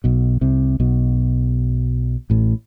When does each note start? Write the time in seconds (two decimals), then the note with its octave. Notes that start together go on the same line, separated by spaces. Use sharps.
0.04 B1 B2
0.41 C2 C3
0.80 B1 B2
2.30 A1 A2